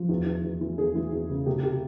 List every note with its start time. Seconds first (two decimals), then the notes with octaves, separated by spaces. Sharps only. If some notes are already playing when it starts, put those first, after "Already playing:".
Already playing: F3
0.09 E2
0.26 E2
0.44 E2
0.61 E3
0.78 E2 G#4
0.95 E3
1.12 E2
1.30 C#3
1.46 C3 G4
1.63 G4